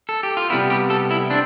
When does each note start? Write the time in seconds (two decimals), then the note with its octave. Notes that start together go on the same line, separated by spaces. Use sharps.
0.09 A4
0.23 G4
0.37 F4
0.50 C3 G3 B3 E4
0.70 G4
0.90 A4
1.11 E4
1.30 C4 D4